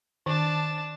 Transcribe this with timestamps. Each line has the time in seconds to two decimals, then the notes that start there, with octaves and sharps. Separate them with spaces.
0.26 D#3 D4 A5